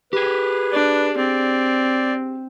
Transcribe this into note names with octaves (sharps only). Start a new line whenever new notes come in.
G4 G#4 B4
D4
C4 D5